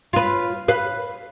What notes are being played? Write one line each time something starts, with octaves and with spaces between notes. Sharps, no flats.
F4 B4
B4 F5